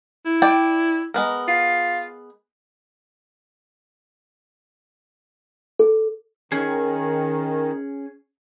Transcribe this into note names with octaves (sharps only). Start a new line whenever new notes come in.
E4
D5 G5
G#3 B3 A#4
F4
A4
D#3 C#4 G#4